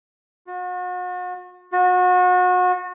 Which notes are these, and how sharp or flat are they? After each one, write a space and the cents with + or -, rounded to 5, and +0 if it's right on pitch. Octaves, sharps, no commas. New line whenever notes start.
F#4 -40
F#4 -30